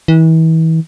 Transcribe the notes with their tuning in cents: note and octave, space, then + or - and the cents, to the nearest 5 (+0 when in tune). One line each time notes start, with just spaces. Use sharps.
E3 -35